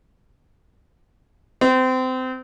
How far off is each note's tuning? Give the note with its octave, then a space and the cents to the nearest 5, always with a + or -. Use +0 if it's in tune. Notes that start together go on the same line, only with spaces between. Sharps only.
C4 -25